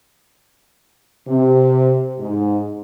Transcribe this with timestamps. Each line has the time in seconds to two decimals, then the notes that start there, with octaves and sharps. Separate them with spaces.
1.26 C3
2.19 G#2